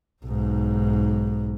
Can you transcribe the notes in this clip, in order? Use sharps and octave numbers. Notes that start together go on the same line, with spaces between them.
B1 G#2